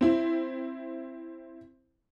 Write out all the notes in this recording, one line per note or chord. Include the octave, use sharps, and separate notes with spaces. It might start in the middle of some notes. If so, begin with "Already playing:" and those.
C4 E4